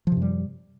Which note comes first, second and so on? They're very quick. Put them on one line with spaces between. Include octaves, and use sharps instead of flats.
F3 C3 F#2 G3